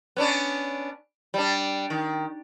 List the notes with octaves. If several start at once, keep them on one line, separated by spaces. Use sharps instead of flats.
B3 C#4 D4
G3 D4
D#3